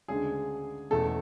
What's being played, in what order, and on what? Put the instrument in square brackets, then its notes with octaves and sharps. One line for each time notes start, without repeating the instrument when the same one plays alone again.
[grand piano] D2 C#3 G#3 D4 G#4
E2 B2 A3 C#4 A4